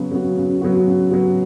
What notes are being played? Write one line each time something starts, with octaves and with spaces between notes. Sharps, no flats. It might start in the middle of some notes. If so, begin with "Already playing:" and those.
Already playing: C#3 F#3 B3 F#4
F#3 B3 F#4
C#3
F#3 B3 F#4
C#3
F#3 B3 F#4